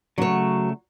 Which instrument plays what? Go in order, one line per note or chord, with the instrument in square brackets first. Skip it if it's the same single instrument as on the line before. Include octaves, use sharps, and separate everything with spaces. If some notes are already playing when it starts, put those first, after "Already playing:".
[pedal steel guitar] C#3 A3 [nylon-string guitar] F#3 C#5